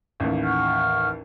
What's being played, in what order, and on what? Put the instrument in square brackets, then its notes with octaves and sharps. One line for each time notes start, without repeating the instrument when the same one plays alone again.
[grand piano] A1 D#2
[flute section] F#5 C#6 F6